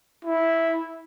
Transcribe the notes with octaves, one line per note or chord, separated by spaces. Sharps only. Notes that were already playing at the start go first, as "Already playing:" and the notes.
E4